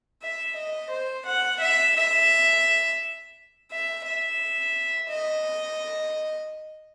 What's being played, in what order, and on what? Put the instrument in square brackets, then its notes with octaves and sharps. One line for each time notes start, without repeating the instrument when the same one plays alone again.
[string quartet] E5
D#5
C5
F#5
E5
E5
E5
E5
D#5